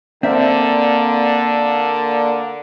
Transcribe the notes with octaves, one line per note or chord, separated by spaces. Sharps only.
D3 A#3 C4 A#4 D5 E5